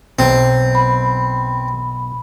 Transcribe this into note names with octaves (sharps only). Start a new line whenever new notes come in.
B1 C4
B5